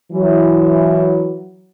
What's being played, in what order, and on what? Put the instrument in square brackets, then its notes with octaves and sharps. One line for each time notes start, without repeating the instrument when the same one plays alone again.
[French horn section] E3 F#3